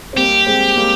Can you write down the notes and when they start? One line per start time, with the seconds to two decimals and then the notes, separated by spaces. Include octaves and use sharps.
0.13 C4
0.17 G3 A#3 G4
0.46 G#3 C4
0.77 G3 A#3